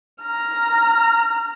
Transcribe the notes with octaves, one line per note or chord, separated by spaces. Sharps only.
A#5 F6